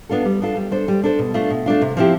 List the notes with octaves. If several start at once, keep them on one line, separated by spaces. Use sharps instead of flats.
B3 D4 F4 A4
G3
B3 D4 F4 A4
G3
D4 A4 C5
G3
D4 A4 C5
B2
A3 D4 F4
B2
A3 D4 F4
C3
F3 C4 E4 G4